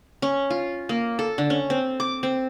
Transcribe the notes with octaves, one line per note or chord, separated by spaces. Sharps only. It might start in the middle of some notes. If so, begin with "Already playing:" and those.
C#4
F4
A#3
A4
D3
C#4
C4
D6
C4